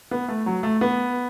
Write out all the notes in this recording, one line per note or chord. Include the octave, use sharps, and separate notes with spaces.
B3
A3
F#3
A3
B3